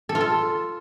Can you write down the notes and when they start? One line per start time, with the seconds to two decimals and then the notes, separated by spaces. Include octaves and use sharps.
0.09 A4
0.15 F4
0.21 A4